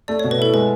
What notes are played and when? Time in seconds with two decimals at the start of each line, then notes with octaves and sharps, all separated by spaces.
0.08 A3 D5
0.19 B2 C#5
0.31 B4
0.39 E4 A4
0.54 G#3 B4